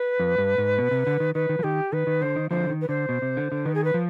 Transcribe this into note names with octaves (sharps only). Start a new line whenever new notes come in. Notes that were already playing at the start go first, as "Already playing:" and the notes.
Already playing: B4
F2
G2
G#2
B2
C3
D3
D#3
D#3 B4
D#3
F3
D#3 G4
D#3 B4
D#3
D3 C5
D#3
D3 F3 C5
D#3
B4
D3 C5
B2
C3
D3
D3
D#3 B4
G#4
B4
F3